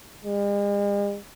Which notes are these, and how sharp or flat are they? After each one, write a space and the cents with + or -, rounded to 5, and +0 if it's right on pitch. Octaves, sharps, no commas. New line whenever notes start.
G#3 -45